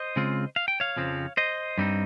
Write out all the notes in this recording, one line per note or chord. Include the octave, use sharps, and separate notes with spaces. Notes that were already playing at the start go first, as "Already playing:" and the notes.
Already playing: C5 D#5
C#3 G#3 C4 F4
F5
G5
C#5 F5
F2 C#3 F3 C4
C5 D#5
G2 G3 C4 D#4